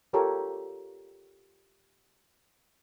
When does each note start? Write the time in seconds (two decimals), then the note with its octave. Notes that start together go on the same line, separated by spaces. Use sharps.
0.13 F4 G4 A4 A#4 C#5